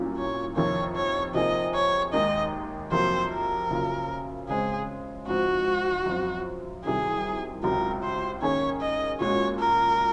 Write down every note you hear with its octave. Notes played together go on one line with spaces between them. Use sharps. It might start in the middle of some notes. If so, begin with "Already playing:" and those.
Already playing: C2 A#2 F#3 C#4 F4
C#5
F2 C3 D#3 A#3 C#5
C#5
C3 F3 A#3 D#4 G#4 D#5
C#5
D#2 D#3 G#3 D#4 D#5
F2 C3 F#3 A#3 C5
A#4
C#3 F#3 A#3 F4
C#3 G#3 C4 G#4
G#2 F3 C4 F#4
F#2 F3 C4 F4
C2 C3 D#3 F#3 G#4
C#2 C3 F#3 A#4
C5
D#3 A#3 C#4 G#4 C#5
D#5
A#2 G#3 C#4 F#4 C#5
A#4